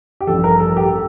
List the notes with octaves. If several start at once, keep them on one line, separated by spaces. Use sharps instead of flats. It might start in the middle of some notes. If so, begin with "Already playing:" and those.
G4
A1 G2 F3 A4
A#4
A4
G4
A4